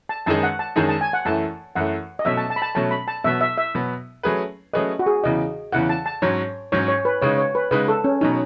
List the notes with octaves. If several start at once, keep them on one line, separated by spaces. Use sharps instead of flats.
A5
F#2 D#3 G#3 D#4 G#4 A5
F#5
A5
F#2 D#3 G#3 D#4 G#4 A5
A5
G#5
F#5
F#2 E3 A3 A5
F#2 E3 A3 F#5
D#5
B2 F#3 A3 C#4 E5
A5
A5
B5
A5
B2 F#3 A3 C#4 A5
B5
A5
B2 F#3 B3 E5
E5
E5
B2 F#3 B3
F#3 A3 C#4 G#4 B4
F#3 A3 C#4 G#4 B4 D#5
F#4
G#4
E2 C#3 E3 D#5
E2 C#3 E3 F#5
A5
A5
G#2 F#3 C#4 C#5
G#2 F#3 C#4 C#5
C#5
B4
C#3 G#3 D#4 C#5
C#5
B4
C#3 G#3 D#4 B4
A4
C#4
B2 F#3 C#4 D#4